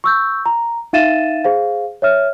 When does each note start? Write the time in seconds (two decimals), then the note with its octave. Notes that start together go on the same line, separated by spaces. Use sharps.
0.04 C#6 E6 G6
0.46 A#5
0.93 D#4 E5 F5 A6 D#7 E7
1.44 G#4 C5 F5
2.02 C#5 E5 F6